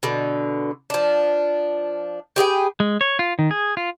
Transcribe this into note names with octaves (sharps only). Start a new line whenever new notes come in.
B2 D3
F3 D4
G4 G#4 B4 G5
G#3
C#5
F4
D#3
G#4
F4